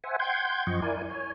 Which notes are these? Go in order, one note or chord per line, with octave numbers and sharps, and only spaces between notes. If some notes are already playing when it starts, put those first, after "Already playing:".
C5 E5 F#5 G#5
F#5 G5 C6 G6 G#6
F#2 F3 D#5 C#6
E4 A#4 D5 G#5
C#5 G#5